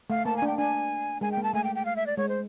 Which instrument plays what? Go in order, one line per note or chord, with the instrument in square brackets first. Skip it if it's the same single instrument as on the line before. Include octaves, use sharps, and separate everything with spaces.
[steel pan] A3 [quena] F5
[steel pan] A#3 [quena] A5
[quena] G#5
[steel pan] D4 [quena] G5
[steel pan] D4 [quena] G#5
[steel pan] G#3 [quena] G#5
[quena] G5
[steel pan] A#3
[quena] A5
[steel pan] A3 [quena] G#5
[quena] G5
G5
F5
E5
D5
[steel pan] G#3 [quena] C#5
[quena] C5